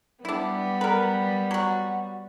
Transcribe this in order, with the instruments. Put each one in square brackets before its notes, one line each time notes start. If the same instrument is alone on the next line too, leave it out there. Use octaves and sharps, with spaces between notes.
[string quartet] G3 B3 [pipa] D4 E4
[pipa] A#4 B4
F#3 F#4